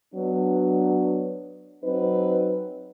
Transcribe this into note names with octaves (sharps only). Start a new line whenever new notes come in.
F#3 B3 D4
F#3 C4 D#4 B4